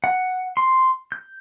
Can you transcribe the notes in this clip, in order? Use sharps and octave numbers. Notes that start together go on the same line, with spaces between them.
F#5
C6
G6